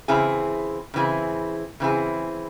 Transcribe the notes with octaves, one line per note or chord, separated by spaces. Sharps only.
C#3 E3 C4 E4 G#4
C#3 E3 C4 E4 G#4
C#3 E3 C4 E4 G#4